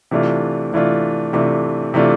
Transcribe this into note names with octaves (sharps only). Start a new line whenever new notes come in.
C3 E3 A3 D4 F4
C3 E3 A3 D4 F4
C3 E3 A3 D4 F4
C3 E3 A3 D4 F4